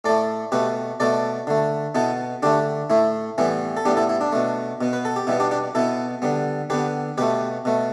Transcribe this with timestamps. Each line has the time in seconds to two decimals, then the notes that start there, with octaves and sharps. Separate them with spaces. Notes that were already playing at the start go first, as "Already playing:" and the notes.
0.05 A2 A3 A4 D5
0.52 B2 A3 G4 B4
1.00 B2 A3 A4 D5
1.47 D3 A3
1.95 B2 B3 E4 A4
2.43 D3 A3 D4 G4
2.90 A2 A3 E4
3.38 A2 E3 G3 B3 E4
3.77 A4
3.85 A2 G3 B3 D4 G4
3.97 E4 A4
4.09 E4
4.21 D4
4.32 B2 A3
4.81 B2 B3
4.93 B4
5.05 A4
5.16 G4
5.27 B2 G3 B3 E4
5.40 D4 G4
5.51 D4 G4
5.75 B2 B3 E4 A4
6.22 D3 G3 B3
6.70 D3 B3 G4 B4
7.18 B2 A3 G4 B4
7.65 B2 A3